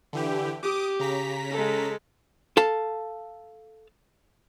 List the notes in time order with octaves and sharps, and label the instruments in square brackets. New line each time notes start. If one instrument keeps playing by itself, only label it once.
[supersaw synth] D3 E3 G4
[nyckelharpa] G4 [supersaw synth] D6 D#6
[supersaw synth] C#3 A#5 B6
[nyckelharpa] G#3 A4
[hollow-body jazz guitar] A4 F5 A5